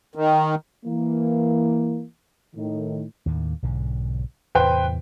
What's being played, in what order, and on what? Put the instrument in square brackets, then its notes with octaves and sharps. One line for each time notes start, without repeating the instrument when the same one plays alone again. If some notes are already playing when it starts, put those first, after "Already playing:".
[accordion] D#3
[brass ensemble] E3 A#3
A2 D#3
[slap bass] D#2 A2 D#3
B1 G#2 D3
[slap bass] E2 A2 C3 [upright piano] B4 C5 G5